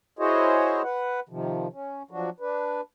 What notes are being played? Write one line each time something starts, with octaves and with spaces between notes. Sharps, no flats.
E4 F#4 G#4 C5 C#5 D#5
B4 F#5
C3 D#3 F3
C#4
F3 F#3 D4 F#4
D4 B4